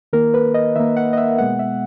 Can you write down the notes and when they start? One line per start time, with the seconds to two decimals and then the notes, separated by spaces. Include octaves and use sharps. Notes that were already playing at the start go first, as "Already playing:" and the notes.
0.13 D#3 A#3 A#4
0.34 B4
0.54 D#5
0.76 D#3 A#3 E5
0.97 F#5
1.13 D#5
1.17 E5
1.38 B2 G#3 B3 F#5
1.59 E5